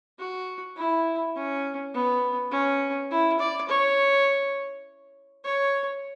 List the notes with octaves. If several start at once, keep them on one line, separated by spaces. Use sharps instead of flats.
F#4
E4
C#4
B3
C#4
E4
D5
C#5
C#5